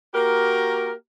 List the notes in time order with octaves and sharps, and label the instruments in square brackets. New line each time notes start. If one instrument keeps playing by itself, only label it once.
[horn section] A#3 F#4 G4 A#4